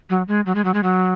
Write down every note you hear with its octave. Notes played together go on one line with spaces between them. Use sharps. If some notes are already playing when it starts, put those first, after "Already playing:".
F#3
G#3
F#3
G#3
F#3
G#3
F#3